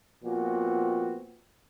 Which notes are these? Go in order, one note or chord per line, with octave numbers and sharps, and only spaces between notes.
A#2 F3 B3 C4 F#4